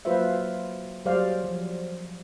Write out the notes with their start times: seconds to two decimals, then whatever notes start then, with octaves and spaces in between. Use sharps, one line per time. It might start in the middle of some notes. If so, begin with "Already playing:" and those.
0.05 F#3 A#3 F4 B4 C5 E5
1.05 F#3 G3 G#4 C5 D5 F5
1.44 F3